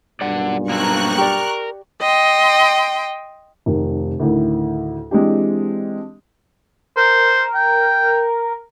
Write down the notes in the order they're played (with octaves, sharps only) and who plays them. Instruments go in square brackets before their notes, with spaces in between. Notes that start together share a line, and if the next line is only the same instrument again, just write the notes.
[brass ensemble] B1 G2 A#2 [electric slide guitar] D5 F#5
[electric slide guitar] A#3 C4 A4 [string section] A#5 C#6 F#6
[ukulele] G4 D5 [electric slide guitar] A#4
[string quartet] D#5 G5 C6
[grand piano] F1 D#3
D2 A2 D#3
E3 G#3 C4 D4 G4
[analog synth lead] A#4 [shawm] C5
[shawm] G5